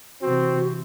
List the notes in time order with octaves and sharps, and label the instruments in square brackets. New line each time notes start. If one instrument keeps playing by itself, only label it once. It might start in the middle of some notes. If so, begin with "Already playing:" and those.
[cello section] C3 E3 [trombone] C4 [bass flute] F#4